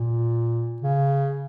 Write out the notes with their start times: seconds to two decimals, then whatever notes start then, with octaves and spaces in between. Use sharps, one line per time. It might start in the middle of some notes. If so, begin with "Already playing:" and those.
Already playing: A#2
0.82 C#3